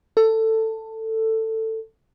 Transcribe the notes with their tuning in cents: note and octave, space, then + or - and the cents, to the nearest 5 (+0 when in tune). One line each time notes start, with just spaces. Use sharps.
A4 +15